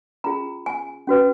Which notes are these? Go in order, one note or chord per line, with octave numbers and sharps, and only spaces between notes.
C#4 F4 G#4 A#5
G#5
C#4 F#4 B4